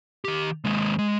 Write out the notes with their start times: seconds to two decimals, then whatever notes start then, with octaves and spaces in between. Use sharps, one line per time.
0.25 D#3 G4
0.65 D#2 G#3
0.99 G#3